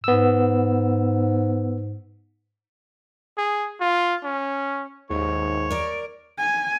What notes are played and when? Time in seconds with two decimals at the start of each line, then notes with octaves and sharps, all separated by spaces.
0.04 G#2 B3 E6
3.38 G#4
3.81 F4
4.24 C#4
5.10 D#2 G#2 C#5
5.70 A#4 D5
6.38 G#5